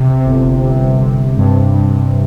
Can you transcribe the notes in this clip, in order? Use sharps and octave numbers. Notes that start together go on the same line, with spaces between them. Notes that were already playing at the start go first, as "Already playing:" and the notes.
Already playing: C3
G1
G1
C3
G2
G2